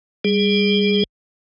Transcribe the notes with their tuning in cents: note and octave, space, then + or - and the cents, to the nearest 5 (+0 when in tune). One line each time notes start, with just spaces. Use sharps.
G3 +15 G#4 -5